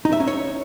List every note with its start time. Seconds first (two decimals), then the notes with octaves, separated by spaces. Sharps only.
0.05 D#4
0.13 E5
0.20 C#4
0.27 C#5